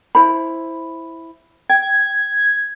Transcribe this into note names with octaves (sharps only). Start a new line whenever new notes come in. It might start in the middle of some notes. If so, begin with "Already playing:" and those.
E4 C5 B5
G5 G#6